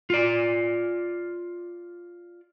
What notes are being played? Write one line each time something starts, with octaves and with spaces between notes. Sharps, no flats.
F4 D5